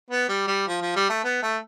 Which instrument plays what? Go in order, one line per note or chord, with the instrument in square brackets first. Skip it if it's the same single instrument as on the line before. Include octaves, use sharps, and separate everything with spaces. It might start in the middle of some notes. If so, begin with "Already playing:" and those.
[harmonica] B3
G3
G3
F3
F3
G3
A3
B3
A3